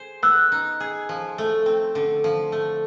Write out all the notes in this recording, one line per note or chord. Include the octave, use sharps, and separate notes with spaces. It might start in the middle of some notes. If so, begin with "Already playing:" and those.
Already playing: G#4 C5
B3 E6 F#6
D#4
G#4
F3
A3
C4
D3
F3
A3